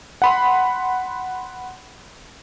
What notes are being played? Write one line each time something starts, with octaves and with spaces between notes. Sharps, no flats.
F#5 B5 C6